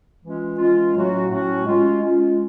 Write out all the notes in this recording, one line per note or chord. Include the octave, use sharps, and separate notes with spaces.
E3 G#3 C#4 F4
E3 G#3 C#4 F4
A2 F#3 A3 C#4 F#4
A2 F#3 A3 C#4 F#4
G#3 C#4 F4
G#3 C#4 F4